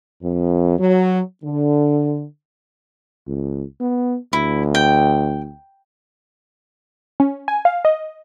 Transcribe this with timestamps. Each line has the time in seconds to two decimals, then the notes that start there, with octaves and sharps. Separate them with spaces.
0.22 F2
0.79 F#3
1.44 D3
3.27 C#2
3.80 B3
4.33 D2 E4
4.75 G5
7.20 C#4
7.48 G#5
7.65 F5
7.85 D#5